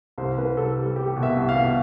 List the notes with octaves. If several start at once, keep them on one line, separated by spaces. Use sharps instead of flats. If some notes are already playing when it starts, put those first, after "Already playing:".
C2 C5
C2 B4
C2 A4
G3
G3 G4
B2
E5
C2
F5
B2